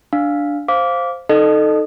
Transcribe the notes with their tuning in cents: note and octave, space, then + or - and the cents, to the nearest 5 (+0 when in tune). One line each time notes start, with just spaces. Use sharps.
D4 +0 F5 +0
C5 +0 F5 +0 D6 -20
D#4 +0 A4 +0 D#5 -30